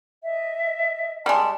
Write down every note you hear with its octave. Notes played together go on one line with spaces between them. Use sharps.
D#5 E5
G3 G#3 A5